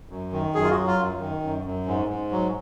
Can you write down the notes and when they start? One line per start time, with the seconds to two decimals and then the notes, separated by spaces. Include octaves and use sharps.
0.09 F#2
0.32 D#3
0.54 F#2 G#4
0.63 F4
0.70 F#4
0.76 F#3
0.87 F4
0.98 F#2
1.20 D#3
1.42 F#2
1.65 F#2
1.86 G#2
2.08 G#2
2.31 F#3